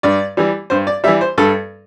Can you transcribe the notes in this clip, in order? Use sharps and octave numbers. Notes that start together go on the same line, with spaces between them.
G2 D5
E3 G3
G2 C5
D5
E3 G3 E5
C5
G2 A4